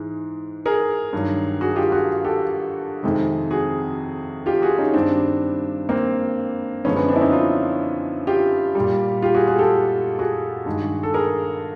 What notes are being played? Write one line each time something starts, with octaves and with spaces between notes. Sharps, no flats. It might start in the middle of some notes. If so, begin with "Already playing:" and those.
Already playing: G#2 E3 G#3
G#4 A#4
G2 D#3 F#3
F#4 G#4
F4 G4
F#4 G#4
G4 A4
F2 C3 D#3 G#3
F#4 G#4
F4 G4
F#4 G#4
C#4 D#4
G2 D#3 G3 C4 D4
A#3 C4
F#2 D3 F3 G#3 B3 C#4
B3 C#4
C4 D4
E4
C#4 D#4
D#4 F4
F4 G4
G3
A#2
F4 G4
F#4 G#4
F#4 G#4
G4 A4
F#4 G#4
G2 D#3 G#3
A4
G#4 A#4